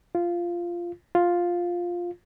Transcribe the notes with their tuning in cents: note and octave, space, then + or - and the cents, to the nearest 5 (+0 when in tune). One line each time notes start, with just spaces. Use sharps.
F4 -10
F4 +5